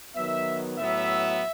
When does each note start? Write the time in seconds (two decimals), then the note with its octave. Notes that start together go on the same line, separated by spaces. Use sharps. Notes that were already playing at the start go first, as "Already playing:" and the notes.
0.15 D#3 F#3 B3 E5
0.78 A2 F#3 B3 E5